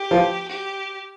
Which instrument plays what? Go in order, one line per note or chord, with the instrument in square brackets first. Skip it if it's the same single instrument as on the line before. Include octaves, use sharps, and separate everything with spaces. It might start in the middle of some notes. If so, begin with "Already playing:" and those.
Already playing: [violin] G4
[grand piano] F3
[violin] G4